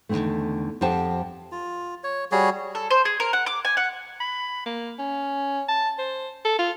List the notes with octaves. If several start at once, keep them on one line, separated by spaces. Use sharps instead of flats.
E2 A2 D3 D#3 A3
F2 G4 C5 F#5 G5 A5
F4
C#5
G3 F#4 G#4 C#5
A4
C5
G#4
A#4
F#5
D6
G#5
F#5
B5
A#3
C#4
A5
C5
A4
F4